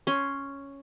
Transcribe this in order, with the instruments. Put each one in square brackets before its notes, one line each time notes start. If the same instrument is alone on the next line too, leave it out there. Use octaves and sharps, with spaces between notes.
[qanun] C#4 C6